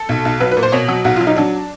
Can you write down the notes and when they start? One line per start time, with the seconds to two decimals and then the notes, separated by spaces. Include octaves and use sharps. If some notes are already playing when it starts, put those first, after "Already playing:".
Already playing: A4
0.09 B1
0.25 B1
0.40 F#3 B4
0.51 B4
0.57 A#2
0.63 C5
0.72 B2 C#5
0.88 F#3
1.05 B1 F#4
1.16 F#3 F4
1.27 D#4
1.36 F#3 D4